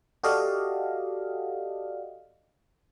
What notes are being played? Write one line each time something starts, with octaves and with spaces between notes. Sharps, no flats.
F#4 G4 A4 D5 D#5 F5